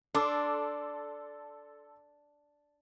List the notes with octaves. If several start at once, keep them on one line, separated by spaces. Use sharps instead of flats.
D4 A4 C6 D6